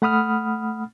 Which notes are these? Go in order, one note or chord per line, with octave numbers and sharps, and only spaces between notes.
A3 F#5 B5 D#6 F6